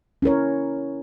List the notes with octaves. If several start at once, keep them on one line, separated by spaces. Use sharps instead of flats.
C#4 E4 A#4 C#5